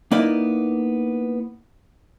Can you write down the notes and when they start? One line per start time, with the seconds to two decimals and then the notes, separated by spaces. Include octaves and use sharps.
0.12 A#3 B3 D#4 E4 D5